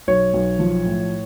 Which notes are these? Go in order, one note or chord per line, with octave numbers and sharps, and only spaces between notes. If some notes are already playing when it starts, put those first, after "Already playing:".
B1 C#5
B1
F3
A2